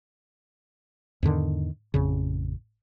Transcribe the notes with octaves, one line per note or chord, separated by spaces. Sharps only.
E2 G#2 D3 D#3
A1 F2 C#3